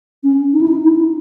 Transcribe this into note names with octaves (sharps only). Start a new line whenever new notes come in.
C#4
D#4
E4
D#4
E4